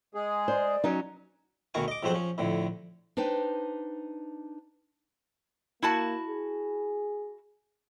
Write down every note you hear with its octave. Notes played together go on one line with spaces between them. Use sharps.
G#3 G#4
C5 D5
F#3 C#4 D#4
D2 B2 D#3 F#4 F5 G#5
D#5 D6
F2 G#2 F#3 C4 C5 F#5
F3 C#4
F2 A2 D3
D4 D#4 B4 C5 G5
A#3 E4 F#4 A5
G#4